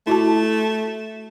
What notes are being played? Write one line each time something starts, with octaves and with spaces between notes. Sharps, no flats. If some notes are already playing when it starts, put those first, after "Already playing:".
A3 E4 F#4 A5